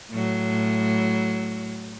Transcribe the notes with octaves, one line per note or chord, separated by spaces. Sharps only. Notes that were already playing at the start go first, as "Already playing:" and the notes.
A2 F#3